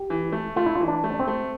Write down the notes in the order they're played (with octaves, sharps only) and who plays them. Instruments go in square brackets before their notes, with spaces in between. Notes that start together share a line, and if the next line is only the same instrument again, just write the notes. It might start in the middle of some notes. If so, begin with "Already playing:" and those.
Already playing: [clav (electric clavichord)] G4
[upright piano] E3
A3
[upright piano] A3 [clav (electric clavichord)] F4
[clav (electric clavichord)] E4
F4
[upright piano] E3
[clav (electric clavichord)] D4
[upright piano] A3
[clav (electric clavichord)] D4
C4
[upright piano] A3